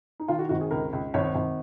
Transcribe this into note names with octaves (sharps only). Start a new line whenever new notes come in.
D#4
D#3 F4
F#4
G#1 F#4
G#4
C#2 A#4
C#2
G#1 C#5
G#1